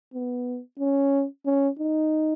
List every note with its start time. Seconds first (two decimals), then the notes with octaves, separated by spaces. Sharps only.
0.14 B3
0.79 C#4
1.46 C#4
1.79 D#4